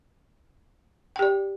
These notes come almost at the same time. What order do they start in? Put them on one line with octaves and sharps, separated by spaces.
G5 G4 D5